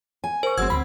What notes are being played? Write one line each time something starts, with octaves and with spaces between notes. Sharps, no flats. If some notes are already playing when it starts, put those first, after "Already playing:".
G#5
A#4 C5 C#6
G1 F#3 G#3 C4 E6 G#6
D2 C4 B5